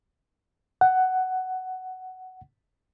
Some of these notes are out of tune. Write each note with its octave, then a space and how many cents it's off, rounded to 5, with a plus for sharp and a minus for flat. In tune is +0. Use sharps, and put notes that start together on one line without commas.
F#5 +10